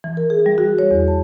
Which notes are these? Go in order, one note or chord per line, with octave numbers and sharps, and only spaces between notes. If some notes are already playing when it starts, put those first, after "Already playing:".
E3
A#4
G#4
G3
F#4
C#5
E2
A5